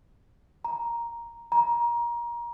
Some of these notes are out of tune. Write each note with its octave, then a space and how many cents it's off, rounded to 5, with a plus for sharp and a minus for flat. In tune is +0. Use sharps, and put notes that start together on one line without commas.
A#5 +5
A#5 +25